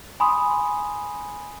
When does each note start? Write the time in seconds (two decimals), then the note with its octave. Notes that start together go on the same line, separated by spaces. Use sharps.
0.20 G#5 B5 C6 D#6